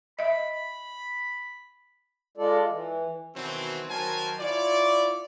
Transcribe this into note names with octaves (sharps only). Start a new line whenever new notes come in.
D#5 E5 B5
G#3 F4 A4 D5
E3
B2 D#3 E3 F#3 C4
D#3 F#3 A#4 C5 G#5 A5
E4 F4 C#5 D5